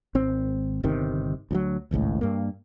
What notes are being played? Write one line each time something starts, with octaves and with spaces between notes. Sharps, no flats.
G#1 C4
G1 C3 D#3
D2 F3 F#3
D#1 G#1 C#2 A2
G2 A#3